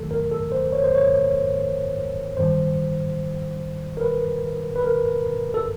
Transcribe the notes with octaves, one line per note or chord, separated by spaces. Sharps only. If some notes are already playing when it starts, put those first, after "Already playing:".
Already playing: D#2 D#3 F#3 A3 A4
A#4
A4
C5
C#5
C5
C#5
G2 D#3 G3 C5
A#4
B4
B4
A#4
A4